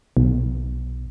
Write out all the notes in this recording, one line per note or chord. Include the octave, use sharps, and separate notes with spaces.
B1